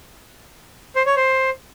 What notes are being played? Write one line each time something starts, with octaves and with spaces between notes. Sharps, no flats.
C5
C#5
C5